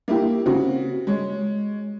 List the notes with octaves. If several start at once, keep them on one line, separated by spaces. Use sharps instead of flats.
A#3 E4 G4
C#3 C4 F#4
G#3 C#5